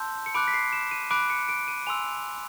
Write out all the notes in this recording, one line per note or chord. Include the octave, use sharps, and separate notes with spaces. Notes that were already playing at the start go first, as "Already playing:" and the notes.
Already playing: A5 C6 E6 G6
C#7
B5 D6 F#6 D7
B6
C7
E7
D#7
B5 D6 F#6 D7
C#7
D7
D#7
G#5 C6 E6 F7